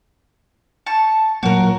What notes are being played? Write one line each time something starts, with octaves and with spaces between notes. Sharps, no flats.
A5 C#6
A#2 F#3 A#3 F#4 A#4